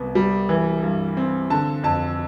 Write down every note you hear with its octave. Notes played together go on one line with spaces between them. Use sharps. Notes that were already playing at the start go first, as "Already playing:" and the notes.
Already playing: C2 B3
G3
E3
G2
C4
D3 A5
F2 A5